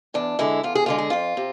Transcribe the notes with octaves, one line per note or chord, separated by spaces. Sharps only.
E2 D4
D3 G#3 E4
E2 F4
G#4
D3 G#3 F4
G#4
F2 F4
C3